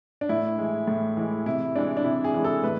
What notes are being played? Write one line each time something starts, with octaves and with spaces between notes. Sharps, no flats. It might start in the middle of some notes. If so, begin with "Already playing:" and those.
D4
A2 E4
E3 G#3
A2
E3 G#3
C3 E4
E3 G#3 D4
D4
C3 E4
G#4
E3 G#3
A4
A2 B4